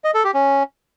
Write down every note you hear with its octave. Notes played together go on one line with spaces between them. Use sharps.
D#5
A4
G4
C#4